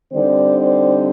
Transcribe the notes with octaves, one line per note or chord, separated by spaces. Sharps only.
D3 G3 C4 D#4 C5 D5
C5 D5